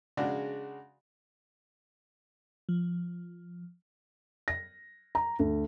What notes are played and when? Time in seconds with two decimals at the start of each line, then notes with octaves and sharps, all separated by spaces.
0.17 C#3 G#3 D4 F#4
2.69 F3
4.48 A#6
5.15 A#5
5.39 D2